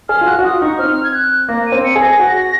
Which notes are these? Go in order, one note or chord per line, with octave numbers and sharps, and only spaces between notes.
G#4 F6
F4
F#4 F#6
F#4
F4 D#6
D#4 C#6
D#6
C4 F6
G#6
F#6
A#3 A#6
D#7
C4
C#7
G#4
A#6
F#4